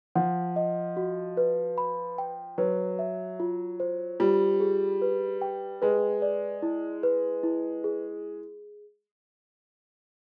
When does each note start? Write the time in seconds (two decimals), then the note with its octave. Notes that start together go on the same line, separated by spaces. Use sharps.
0.15 F3 F#5
0.56 D#5
0.97 F#4
1.37 B4
1.78 B5
2.18 G5
2.58 F#3 B4
2.99 E5
3.40 F4
3.80 C5
4.20 G3 F4
4.60 G#4
5.02 B4
5.42 G5
5.82 G#3 B4
6.22 D5
6.62 E4
7.03 B4
7.43 E4
7.84 G#4